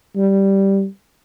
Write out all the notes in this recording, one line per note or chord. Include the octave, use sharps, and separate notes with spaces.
G3